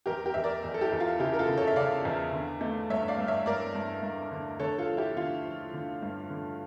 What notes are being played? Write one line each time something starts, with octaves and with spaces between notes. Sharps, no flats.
E2 G4 A#4
G4 A#4
E2 E5
A#4 D5
E2
A4
E4 G4
E2
F4
C#3 E4 G4
A#4
F4 A4
C#3
A4 C#5
E5
C#3 D5 F5
E2
D3
A3
G2 C#5 E5
D5 F5
G2
C#5 E5
G2 A#4 D5
G2
G2
D3
D3 A4 C#5
F4 A4
F3
E4 G4
D3 F4
F3
D3
G2
D3